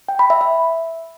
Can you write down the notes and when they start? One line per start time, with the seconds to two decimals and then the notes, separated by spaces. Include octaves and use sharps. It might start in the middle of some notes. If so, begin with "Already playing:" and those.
0.09 G5
0.19 B5
0.30 E5
0.41 E5